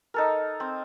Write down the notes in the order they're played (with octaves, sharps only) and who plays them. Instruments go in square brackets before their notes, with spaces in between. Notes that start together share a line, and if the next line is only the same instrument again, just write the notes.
[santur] D#4 A4 A#4
C4